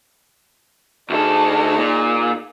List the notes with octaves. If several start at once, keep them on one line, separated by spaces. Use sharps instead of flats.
D2 D#4 G#4 A4
A#2